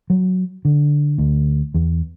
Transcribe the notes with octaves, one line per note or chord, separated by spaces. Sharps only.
F#3
D3
D2
E2